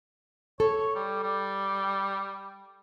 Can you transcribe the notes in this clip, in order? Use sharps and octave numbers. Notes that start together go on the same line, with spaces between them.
A4 C#5
G3
G3